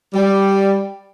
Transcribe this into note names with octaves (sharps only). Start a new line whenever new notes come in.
G3